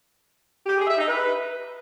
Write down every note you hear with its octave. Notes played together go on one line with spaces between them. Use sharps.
G4
G#4
E5
D#4
B4